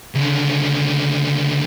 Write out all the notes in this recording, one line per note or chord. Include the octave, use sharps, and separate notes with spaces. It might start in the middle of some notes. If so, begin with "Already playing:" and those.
C#2 D3